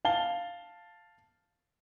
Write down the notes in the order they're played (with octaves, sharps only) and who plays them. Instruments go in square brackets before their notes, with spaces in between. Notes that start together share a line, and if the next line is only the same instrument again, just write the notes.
[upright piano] F5 A5 G7